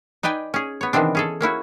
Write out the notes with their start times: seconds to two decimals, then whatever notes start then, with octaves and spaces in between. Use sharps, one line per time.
0.23 D#4 B4 D5 G5 G#5
0.54 C#4 G#4
0.81 B3 C#5
0.93 C3 D#3 E3 B3 C4 D4
1.15 C#4 G#4 A4
1.41 A#3 C#4 E4 F#4